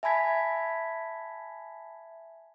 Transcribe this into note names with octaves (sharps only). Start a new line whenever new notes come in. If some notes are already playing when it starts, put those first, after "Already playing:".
E5 G#5 A5 B5 G#6 B6